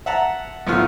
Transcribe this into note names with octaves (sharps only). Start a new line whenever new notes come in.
E5 F#5 A5 A#5
B1 A2 B3 F4 F6